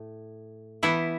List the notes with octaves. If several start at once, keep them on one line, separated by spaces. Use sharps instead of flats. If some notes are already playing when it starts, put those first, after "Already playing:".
Already playing: A2
E3 B3 E4